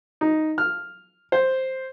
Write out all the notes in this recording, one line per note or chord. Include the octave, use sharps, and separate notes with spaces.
D#4
F6
C5